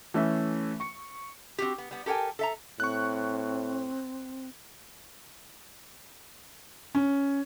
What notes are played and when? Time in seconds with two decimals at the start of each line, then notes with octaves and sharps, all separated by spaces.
0.14 E3 A3 C#4 E5
0.80 C#6 C#7
1.58 C4 F#4 G4
1.78 B3
1.91 G3 B3
2.06 G4 A4 A#4 G5 G#5
2.39 A4 E5 A#5
2.80 A2 C4 C#6 F#6
6.95 C#4